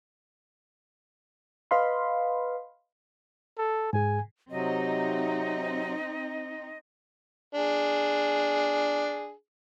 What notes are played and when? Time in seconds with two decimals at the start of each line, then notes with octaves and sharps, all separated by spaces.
1.71 B4 D#5 F5 B5 C6
3.59 A4
3.93 G#2 G#4 G#5
4.51 C3 F#3 C4 D#4 D#5
7.55 D4 G#4